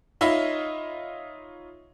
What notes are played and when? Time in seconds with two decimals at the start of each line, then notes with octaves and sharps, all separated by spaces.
0.21 D#4 F4 C#5 D#5 E5 B5